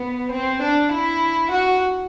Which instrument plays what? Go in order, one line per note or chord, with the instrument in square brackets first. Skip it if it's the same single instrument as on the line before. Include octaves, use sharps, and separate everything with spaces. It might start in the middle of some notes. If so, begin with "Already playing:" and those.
Already playing: [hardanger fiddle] B3
C4
D4
E4
F#4